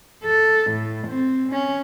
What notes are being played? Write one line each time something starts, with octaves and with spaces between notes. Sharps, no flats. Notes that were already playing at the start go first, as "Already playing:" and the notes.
A4
A2
C4
C#4